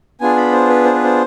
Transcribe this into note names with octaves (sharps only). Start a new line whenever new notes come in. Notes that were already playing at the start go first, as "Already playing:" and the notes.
B3 D4 F4 G#4 G#5
B5
C5
B4
C5
B4
C5